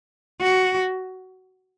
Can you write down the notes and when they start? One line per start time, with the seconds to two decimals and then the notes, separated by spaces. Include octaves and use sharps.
0.41 F#4